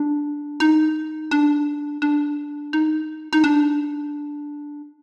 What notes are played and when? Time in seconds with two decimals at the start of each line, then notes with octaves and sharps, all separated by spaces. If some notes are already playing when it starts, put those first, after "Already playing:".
Already playing: D4
0.60 D#4
1.31 D4
2.02 D4
2.73 D#4
3.33 D#4
3.44 D4